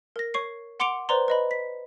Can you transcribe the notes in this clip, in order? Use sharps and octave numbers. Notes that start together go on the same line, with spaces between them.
A#4 A#6
C#5 C#6 C7
F#5 C6 D6 C#7 D7 F7
B4 C5 D5 A#5 C6
B4 D#5 B5
B6